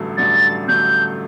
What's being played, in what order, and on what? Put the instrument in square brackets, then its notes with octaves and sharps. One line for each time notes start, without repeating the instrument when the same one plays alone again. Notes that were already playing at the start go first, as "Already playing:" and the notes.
Already playing: [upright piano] A1 G2 D3 F#3 A3
[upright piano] A1 G2 D3 F#3 A3 [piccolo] A6
[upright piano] A1 G2 D3 F#3 A3 [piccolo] G6